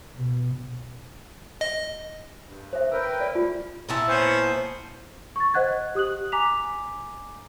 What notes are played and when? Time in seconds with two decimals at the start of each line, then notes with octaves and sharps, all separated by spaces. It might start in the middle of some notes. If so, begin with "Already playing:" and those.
0.15 B2
1.61 D#5
2.43 G2
2.73 C5 E5
2.92 A#4 B4 G5 E6
3.21 D5
3.35 G3 A3 F4
3.89 A#2 E4 A5
4.08 B3 C#4 C5
5.36 C#6 A6
5.54 C5 D#5 F#5 F#6 G#6
5.95 G4 D#6 F#6 F#7
6.32 G#5 A#5 D6 B6 F7